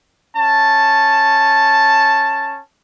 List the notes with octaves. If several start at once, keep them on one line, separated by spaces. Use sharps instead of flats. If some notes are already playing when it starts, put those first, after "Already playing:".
C#4 A5